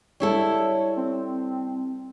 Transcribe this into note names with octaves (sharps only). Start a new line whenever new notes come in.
G3 E4 A4 C#5
C4